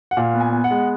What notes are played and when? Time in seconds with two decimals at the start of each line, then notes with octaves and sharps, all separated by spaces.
0.11 F#5
0.17 A#2 F5
0.34 B3
0.40 G#5
0.52 B3
0.64 F#5
0.71 G#3